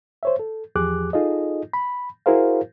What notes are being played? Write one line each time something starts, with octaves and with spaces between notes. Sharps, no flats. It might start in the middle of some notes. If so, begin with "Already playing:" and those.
C5 C#5 E5
A4
E2 F3 G4 G#4 D6 F#6
D#4 F4 G#4 A4 D#5
B5
E4 F#4 G#4 A#4 C5 F5